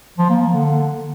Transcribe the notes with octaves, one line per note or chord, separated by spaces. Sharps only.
F3
A#3
A#3
D3